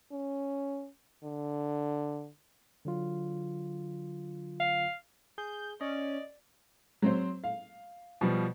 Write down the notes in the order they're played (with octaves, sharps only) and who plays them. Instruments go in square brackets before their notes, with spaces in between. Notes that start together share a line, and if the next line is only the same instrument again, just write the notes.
[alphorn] C#4
D3
[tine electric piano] D3 F#3 F4
[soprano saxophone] F5
[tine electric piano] G#4 [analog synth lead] G6
[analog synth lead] C#4 [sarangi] D5 [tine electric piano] D#5
[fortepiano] F#3 C4 C5
F5
[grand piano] B2 F3 G3